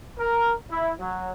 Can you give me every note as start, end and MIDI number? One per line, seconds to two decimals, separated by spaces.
0.18 0.52 70
0.70 0.92 64
0.99 1.31 54